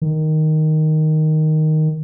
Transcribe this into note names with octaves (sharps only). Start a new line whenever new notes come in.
D#3